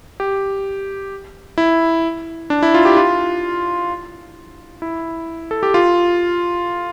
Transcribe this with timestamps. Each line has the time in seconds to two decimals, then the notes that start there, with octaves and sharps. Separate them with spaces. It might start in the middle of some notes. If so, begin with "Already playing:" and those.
0.20 G4
1.58 E4
2.50 D4
2.63 E4
2.74 F4
2.85 G4
2.97 F4
4.82 E4
5.51 A4
5.63 G4
5.74 F4